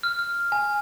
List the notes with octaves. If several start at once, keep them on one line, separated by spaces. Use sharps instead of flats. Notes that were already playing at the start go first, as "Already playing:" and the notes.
F6
F6
G#5